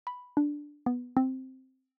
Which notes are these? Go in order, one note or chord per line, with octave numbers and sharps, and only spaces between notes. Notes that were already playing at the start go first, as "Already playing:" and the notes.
B5
D4
B3
C4